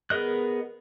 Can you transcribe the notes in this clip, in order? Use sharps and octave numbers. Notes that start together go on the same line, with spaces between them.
B3 G#4 A#4 D#5 F#6